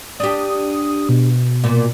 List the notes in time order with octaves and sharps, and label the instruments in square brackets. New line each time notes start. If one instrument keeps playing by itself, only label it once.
[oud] D4 G4 [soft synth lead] D#6
[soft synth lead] B2
[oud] A#2